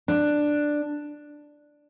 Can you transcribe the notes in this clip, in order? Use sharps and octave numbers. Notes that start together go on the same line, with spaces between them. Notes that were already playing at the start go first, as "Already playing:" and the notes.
D4